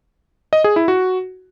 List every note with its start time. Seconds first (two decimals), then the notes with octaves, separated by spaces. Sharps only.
0.53 D#5
0.64 G#4
0.76 E4
0.88 F#4